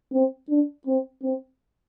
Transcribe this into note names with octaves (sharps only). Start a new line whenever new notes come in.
C4
D4
C4
C4